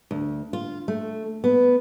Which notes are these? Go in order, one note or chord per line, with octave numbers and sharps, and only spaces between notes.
D2
F4
A3
B3